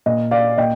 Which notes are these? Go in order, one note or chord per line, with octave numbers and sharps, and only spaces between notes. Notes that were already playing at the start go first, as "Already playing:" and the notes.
A#2 D#5
D5 F5
A#2 D#5 G5